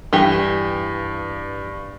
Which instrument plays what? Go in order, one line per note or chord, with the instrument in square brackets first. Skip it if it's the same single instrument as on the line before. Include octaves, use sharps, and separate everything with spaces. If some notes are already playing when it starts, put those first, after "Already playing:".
[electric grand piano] G2 [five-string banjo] E3 G4